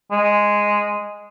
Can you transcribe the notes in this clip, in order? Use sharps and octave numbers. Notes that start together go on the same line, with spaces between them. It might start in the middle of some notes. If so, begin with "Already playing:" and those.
G#3